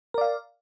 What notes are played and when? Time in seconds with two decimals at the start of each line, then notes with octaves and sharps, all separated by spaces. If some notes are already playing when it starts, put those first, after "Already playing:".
0.14 A#4
0.18 D5
0.21 F5